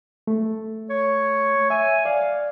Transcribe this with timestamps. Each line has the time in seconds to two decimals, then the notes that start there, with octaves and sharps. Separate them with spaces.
0.27 A3
0.90 C#5
1.70 E5 G#5
2.05 D5 F5